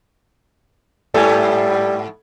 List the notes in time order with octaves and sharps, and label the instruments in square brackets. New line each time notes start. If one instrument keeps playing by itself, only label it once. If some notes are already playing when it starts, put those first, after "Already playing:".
[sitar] G#2 A3 B3 [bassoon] G3 [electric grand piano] A4 G#5